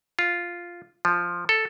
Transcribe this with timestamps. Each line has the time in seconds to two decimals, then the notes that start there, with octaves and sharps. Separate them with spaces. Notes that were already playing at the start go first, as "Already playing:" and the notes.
0.19 F4
1.05 F3
1.49 A4